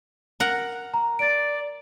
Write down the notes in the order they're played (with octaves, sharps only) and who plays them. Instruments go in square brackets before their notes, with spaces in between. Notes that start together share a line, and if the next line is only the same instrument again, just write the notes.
[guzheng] A#4 F#5
[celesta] A#5
[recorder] D5 [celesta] A6 D7